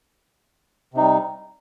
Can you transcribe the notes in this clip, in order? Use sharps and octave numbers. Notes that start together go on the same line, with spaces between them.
C3 G3 D#4